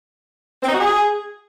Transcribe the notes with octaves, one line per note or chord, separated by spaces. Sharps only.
C4
D#4
F#4
G#4